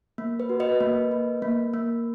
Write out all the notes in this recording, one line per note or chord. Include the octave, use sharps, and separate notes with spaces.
A#3
B4
F#4
B4 D#5
A#3
A#3
A#3
A#3